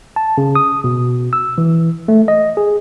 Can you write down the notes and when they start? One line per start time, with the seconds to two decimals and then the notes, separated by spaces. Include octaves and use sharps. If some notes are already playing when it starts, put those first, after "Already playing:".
0.16 A5
0.38 C#3
0.55 D#6
0.84 B2
1.33 E6
1.58 E3
2.08 A3
2.28 D#5
2.57 G#4